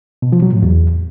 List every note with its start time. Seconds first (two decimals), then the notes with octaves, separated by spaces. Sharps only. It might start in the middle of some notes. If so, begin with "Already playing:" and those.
0.22 B2
0.32 F3
0.42 F#3
0.53 A2
0.63 E2